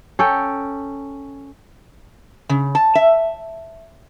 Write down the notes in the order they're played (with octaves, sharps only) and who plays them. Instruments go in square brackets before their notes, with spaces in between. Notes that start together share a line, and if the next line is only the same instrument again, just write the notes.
[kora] C#4 A4 G5
[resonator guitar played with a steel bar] C#3
A5
E5